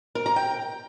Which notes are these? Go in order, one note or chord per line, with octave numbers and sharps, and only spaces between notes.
A#4
A#5
G5